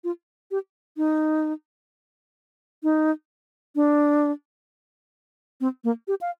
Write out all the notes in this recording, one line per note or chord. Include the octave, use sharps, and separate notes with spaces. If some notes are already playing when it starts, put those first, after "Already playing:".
F4
G4
D#4
D#4
D4
C4
A#3
G4
F5